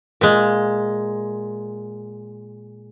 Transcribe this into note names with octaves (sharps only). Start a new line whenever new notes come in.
A#2 G#3